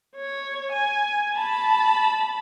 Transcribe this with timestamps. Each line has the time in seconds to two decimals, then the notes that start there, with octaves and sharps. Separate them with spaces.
0.15 C#5
0.72 G#5
1.35 A5 B5